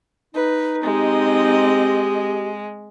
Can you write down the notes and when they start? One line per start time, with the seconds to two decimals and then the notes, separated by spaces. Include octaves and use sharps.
0.35 D#4 B4
0.84 G#3 C4 G4 D#5